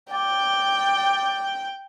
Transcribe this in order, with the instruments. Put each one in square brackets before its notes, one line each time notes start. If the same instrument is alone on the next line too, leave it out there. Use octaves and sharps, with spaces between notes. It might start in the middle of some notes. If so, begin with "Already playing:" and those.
[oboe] D5 [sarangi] G5